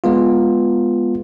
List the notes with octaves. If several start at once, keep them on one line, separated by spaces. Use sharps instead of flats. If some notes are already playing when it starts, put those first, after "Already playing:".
G#3 B3 F4